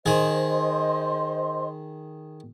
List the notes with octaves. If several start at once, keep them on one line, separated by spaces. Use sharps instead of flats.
D#3 G#4 C5 D#5 C6